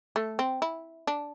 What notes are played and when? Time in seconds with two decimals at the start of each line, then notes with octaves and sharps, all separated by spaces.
0.16 A3
0.39 C4
0.62 E4
1.07 D4